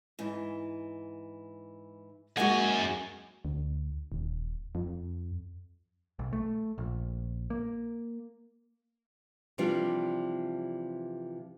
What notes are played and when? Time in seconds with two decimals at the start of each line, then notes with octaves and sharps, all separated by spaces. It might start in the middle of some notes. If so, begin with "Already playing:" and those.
0.19 G#2 E3
2.37 F#2 G#3 A#3 D#4 F#4 F#5 G#5
3.45 D2
4.12 D#1
4.75 F2
6.19 B1
6.33 A3
6.78 A#1
7.50 A#3
9.58 C3 E3 F3 G3 D4 F4